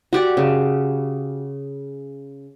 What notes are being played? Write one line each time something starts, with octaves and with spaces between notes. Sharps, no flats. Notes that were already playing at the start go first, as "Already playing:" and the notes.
F#4 G4 D5
C#3